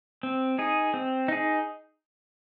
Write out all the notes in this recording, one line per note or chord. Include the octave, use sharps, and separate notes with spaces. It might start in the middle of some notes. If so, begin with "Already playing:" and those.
C4
D#4 G#4
C4
D#4 G#4